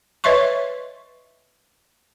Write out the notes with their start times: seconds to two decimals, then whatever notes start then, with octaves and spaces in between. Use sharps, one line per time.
0.24 B4 C#5 D#5 E5 C6 C#6